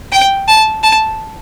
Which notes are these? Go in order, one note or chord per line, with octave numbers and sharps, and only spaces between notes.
G5
A5
A5